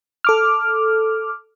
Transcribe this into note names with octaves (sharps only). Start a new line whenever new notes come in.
A4 D6 F6